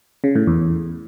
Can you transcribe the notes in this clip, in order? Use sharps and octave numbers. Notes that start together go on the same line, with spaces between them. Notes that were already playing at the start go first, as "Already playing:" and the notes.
C#3
A2
E2